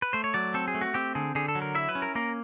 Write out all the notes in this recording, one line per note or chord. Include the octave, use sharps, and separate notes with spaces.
B4
A3 C5
C#5
F#3 D5
C4 A4
G#4
A3
F#4
C4 G4
D3 G#4
D3 G#4
A4
F#3
A#4
E4 E5
B4
C#4
A#4
A#3 A#4